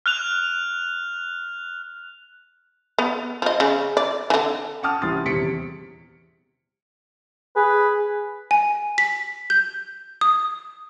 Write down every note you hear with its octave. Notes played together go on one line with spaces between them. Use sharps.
F6 F#6 F7
B3
F3 D#5
C#3
D5
D3 E3
F#5 G5 A5 D6 D#6 F6
C2 E3 C#4 C6 D#6 A6
D#1 E2 C3 B6 C#7 D7
G#4 B4
G#5
B6
G6
D#6